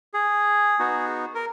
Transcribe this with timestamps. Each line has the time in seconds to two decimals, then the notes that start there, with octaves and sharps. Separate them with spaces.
0.14 G#4
0.79 B3 D#4 F#4
1.35 A#4